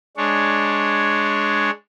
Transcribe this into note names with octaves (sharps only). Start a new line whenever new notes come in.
G#3 D4 C#5